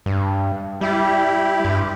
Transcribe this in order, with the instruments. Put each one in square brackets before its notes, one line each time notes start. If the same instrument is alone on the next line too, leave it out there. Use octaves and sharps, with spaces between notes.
[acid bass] G2
[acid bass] G3 [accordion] E4 G4
[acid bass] G2